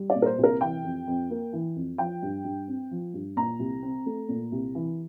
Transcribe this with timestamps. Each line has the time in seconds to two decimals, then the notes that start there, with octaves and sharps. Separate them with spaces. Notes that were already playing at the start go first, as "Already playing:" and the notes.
Already playing: G3
0.10 D5
0.15 A#2
0.22 A#4
0.26 C5
0.38 C2
0.44 A#4
0.61 E3 G5
0.84 F2
1.07 F2
1.30 A#3
1.53 E3
1.76 F2
1.98 F3 G5
2.22 G2
2.45 G2
2.68 C4
2.91 F3
3.14 G2
3.36 A#2 A#5
3.59 C2
3.83 C4
4.06 A3
4.29 A#2
4.52 C2
4.75 E3